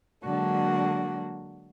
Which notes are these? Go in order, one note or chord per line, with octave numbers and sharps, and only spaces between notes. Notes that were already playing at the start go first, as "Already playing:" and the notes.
D3 F#3 G#3 A#3 D4 F#4